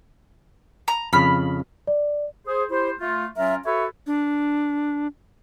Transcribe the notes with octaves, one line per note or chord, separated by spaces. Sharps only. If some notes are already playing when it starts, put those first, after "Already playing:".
A#5
F2 C#3 B5 F6
D5
G#4 C5
E4 G4 C5
A3 F4
F#3 C#4 F4 A#4 E5
F#4 A4 B4 C#5 E5
D4